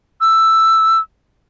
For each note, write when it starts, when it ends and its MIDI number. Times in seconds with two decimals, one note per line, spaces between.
0.21 0.99 88